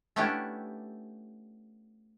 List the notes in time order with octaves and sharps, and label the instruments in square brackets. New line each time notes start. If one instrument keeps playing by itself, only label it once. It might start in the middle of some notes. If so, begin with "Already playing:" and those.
[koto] A3 B3 C#4 D4 E4 G4